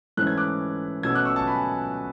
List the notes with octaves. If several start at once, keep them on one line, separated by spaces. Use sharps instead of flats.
G#2 E3 A3 C#4 F#6
G#6
D6 F#6
B2 A3 C#4 E6 G#6
D6 F#6
C#6 E6
A5 C#6
G#5 B5